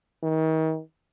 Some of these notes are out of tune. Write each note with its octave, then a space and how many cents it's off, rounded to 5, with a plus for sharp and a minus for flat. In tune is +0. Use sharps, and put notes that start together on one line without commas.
D#3 +35